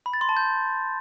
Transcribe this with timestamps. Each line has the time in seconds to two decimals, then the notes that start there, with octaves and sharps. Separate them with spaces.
0.06 B5
0.14 A6
0.21 C6
0.29 A5
0.37 G6